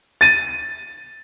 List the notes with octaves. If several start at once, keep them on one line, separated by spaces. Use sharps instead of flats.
A6 D#7